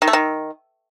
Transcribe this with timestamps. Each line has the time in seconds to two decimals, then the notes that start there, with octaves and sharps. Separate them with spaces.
0.02 D#3
0.08 A3
0.13 D#3